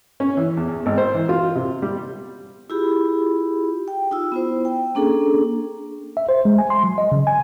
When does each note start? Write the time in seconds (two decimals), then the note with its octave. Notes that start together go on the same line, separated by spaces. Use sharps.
0.20 C#4
0.37 E3
0.57 E2
0.68 E2
0.86 G#1
0.98 C5
1.14 E3
1.29 F4
1.55 C3
1.82 G3
2.70 E4 F4 G4 G#4 B5
3.88 G5
4.11 D#4 F4 E6
4.32 B3 E4 C5
4.65 G5
4.95 A#3 C#4 D4 G#4 A4
6.17 E5
6.29 C5
6.45 G#3
6.58 G#5
6.70 C6
6.84 F#3
6.98 D#5
7.12 C#3
7.27 G#5